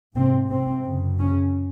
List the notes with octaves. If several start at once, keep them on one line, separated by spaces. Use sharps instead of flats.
G#2 C3 C4
C3 C4
F#2 C#3
C#3 C#4